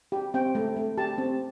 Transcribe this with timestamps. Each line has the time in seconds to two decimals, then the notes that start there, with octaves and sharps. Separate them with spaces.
0.12 G4
0.34 C4 G5
0.55 A3
0.76 A3
0.98 G4 A5
1.18 C4